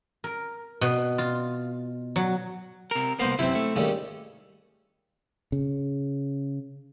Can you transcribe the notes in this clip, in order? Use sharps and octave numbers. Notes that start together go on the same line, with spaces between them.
A#4
B2
F4
F#3
C3 A#4
C2 A#3 B3 C5
F#2 C3 C4 E4
A3
D#2 C#3 G3
C#3